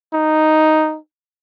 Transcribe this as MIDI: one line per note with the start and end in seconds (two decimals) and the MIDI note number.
0.13 0.98 63